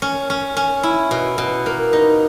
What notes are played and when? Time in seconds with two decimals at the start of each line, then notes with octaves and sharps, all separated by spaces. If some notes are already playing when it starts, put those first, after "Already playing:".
0.02 C#4
0.30 C#4
0.57 C#4
0.83 E4
1.11 B2
1.38 B2
1.66 A#3
1.93 D#4